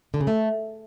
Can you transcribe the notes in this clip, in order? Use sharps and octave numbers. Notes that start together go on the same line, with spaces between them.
D3
C#3
A3